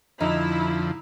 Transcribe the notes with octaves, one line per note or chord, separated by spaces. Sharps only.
F2 D3 F3 D#4 E4